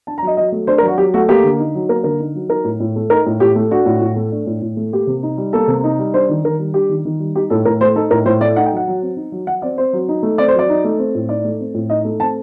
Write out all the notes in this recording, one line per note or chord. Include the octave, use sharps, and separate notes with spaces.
D4 A5
A#5
F#3 D#5
F#3 D#5
A3
D4 C5
A#4
F#3
F#4
F#3 G4
A3 F#4
A#3 G4
D3
D#4
F#3
A#3 A#4
D3 A#4
D#4
F#3
D#4 A#4
A2
A2
A3
D#4 A#4
A2
A2 G4
A3
D4 F#4
A2
A2
A3
D4
A2
A2
A3
A#3 G4
C3
D#4
G3
A#3 A4
C3
D#4
G3
D4 C5
D#3
D#3 A#4
G3
D4 G4
D#3
D#3
G3
D#4 G4
A2 A4
A2 A#4
A3 C5
D#4 A4
A2 A#4
A2 C5
A3 D5
D#4 F#5
G5
F#3 F#5
F#3
C4
D#4
F#3
F#3 F#5
C4 D5
C4 C5
F#3
D#4
A3
C4 D5
C5
F#3 D5
D#4
A3
C4
A2
D#4 D5
A3
C4
A2
D#4 D#5
A3
C4 A5